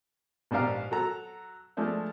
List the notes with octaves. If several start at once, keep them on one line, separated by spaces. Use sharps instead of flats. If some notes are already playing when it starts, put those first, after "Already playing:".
A#1 G#2 D4 G4 F5 A#5
F#3 A4 A#5
F3 G#3 A3 D4